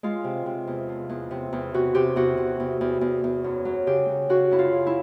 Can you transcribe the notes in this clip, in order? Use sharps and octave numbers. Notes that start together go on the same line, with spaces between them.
G#3 F4
C3
C3
E2
F3
E2
C3
E2
C3 F#4
C3 G4
E2 F#4
C3
E2
E2
E2
E2
F#2
F#3
C#3 G4
F#3
C#3 F#4
F#2 E4
F4
C#3
E4